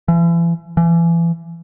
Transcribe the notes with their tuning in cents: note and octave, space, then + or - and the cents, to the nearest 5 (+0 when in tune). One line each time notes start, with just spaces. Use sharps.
E3 +40
E3 +35